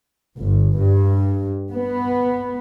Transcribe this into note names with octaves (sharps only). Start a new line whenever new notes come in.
G1
G2
B3